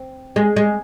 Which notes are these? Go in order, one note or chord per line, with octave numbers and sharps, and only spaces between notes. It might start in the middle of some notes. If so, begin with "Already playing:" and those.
Already playing: C4
G#3
G#3